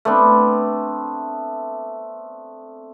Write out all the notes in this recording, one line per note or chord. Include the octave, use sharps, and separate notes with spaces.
A3 B3 C4 D4